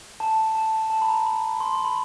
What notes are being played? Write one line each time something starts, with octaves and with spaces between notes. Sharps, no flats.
A5
A5
A5
B5
A#5
B5
C6
C6
B5